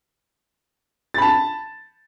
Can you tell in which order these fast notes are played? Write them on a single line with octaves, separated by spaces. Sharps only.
A6 B5 A5